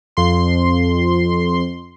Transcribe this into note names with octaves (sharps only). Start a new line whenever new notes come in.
F2 C6